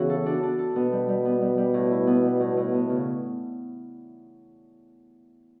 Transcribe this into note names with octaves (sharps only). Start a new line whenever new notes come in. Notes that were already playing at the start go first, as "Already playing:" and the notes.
Already playing: C#3 E3 B3 F#4
A4
D4
D4
A4
B2 B3
G3
G3
B3
G3
G3
A2
E4
B3
G3
A2
A2
B3
C#3